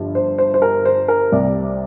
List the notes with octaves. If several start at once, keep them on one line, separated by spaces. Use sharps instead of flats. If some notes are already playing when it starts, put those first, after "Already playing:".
Already playing: G1 G2 F3
C5
C5
C5
A#4
C5
A#4
C2 C3 G3 D5